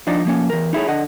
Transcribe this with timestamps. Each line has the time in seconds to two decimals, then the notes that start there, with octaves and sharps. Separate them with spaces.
0.07 F3 D4 D#4 D5
0.25 F3 A#3 C#4
0.50 E2 A#4
0.73 D#4 E4 G#4 C#5
0.88 D3 D#5 F#5